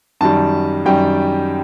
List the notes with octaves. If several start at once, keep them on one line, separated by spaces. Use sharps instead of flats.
F#2 D#3 G3 A5
F#2 D#3 G3 G5